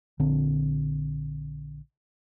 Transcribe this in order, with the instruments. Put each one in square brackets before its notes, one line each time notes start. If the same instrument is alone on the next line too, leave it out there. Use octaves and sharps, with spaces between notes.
[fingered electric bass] A#1 D3 C4